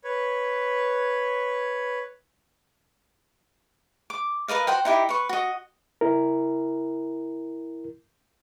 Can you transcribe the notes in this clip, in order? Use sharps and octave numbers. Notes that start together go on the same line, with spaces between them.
B4 C#5
D6
A#4 B4 D#5 F5
F#4 C5 F#5 G5
D#4 E4 G4
B4 C#6
F#4 D#5
E4 A#4